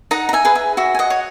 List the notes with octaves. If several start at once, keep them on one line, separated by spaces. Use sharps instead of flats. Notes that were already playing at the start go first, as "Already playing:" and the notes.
D#4 F#5 A#5
A#5
E5 G#5
G#4 B4
E5
F#4 E5
G#5
D#5 F#5
C#5